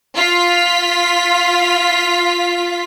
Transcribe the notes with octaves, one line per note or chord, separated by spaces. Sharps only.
F4 B6